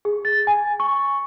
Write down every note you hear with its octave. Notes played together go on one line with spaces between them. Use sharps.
G#4
A6
G#5
C#6